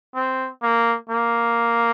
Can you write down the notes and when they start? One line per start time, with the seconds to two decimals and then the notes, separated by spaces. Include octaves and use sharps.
0.15 C4
0.63 A#3
1.10 A#3